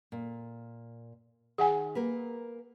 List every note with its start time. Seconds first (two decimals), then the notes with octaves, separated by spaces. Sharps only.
0.12 A#2
1.58 D#3 G#4 F#5 G#5
1.95 A#3 A#4 B4